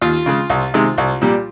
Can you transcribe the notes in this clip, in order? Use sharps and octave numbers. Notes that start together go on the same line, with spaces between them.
D#2 F4
C#3 G#3
C2
C3 D#3 G#3
C2
A#2 G3